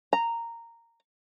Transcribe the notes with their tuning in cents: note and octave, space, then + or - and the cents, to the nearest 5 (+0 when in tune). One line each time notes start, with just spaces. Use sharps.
A#5 -10